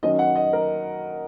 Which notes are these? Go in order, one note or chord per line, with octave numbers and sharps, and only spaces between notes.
D#3 F#3 C#4 D#5
F#5
D#5
A#4